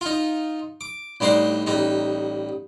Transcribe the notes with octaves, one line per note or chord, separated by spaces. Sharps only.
D#4 F4
D6
A1 G3 D4 D#4 C5 C6
A1 G3 D#4